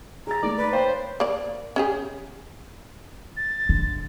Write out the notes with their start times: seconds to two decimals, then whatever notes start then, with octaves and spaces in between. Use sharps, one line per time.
0.27 G#4 A#5 A6
0.42 A3 A#3 D#4 D5
0.57 B4
0.73 C5 C#5 F5 G5
1.20 A#3 D5
1.76 C#4 G4 G#4
3.37 A6
3.69 D3